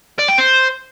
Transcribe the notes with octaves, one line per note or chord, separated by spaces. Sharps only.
D5
G5
C5